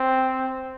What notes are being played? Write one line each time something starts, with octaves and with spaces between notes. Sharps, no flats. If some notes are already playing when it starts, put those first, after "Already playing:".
Already playing: C4